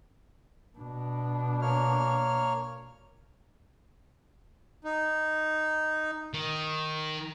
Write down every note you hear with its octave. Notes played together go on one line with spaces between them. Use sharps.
B2 D4
A#3 C#5 F6
D#4
D#3